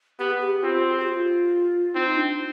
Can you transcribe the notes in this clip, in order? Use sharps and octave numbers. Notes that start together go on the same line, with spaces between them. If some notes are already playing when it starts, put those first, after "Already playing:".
B3 G4
G#4
G4
C4 F4
G#4
G4
F4
C4 D#4
D4